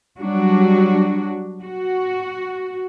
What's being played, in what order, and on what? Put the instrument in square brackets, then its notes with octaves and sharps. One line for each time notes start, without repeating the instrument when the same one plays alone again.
[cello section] F#3 G3 D4 F#4
F#4